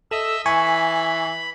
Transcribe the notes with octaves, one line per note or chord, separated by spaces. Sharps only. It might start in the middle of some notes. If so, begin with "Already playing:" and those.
A4 D#5 E5 E6
E3 G#5 B5 C#6